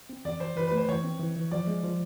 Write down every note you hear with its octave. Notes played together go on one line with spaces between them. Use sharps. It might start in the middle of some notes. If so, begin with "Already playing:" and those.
C4
E3 D5
E3 C5
E3 B4
A3 B4
C5
E3 C#5
C4
E3
E3
F3 D5
G#3
F3